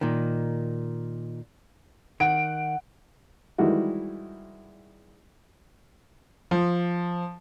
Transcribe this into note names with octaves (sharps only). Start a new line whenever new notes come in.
A#2 D#3
D#3 F#5 D7
D#3 E3 G3 G#3 E4 F#4
F3